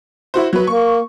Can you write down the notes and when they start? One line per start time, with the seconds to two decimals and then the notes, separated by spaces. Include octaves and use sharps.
0.34 E4 F#4 C5
0.53 F#3 B4
0.67 A#3 C#6